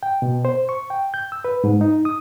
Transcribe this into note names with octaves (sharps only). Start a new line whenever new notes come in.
G5
B2
C5
C#6
G5
G6
E6
B4
G#2
D#4
D#6